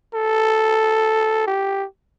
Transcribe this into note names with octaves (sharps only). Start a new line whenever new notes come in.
A4
G4